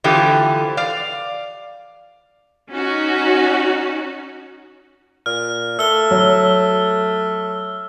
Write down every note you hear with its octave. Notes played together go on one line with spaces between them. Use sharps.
D3 E3 F3 A3 F4 G4
D5 F5
C#4 D#4 F#4
A#2 F6
A3 E6 G7
F#3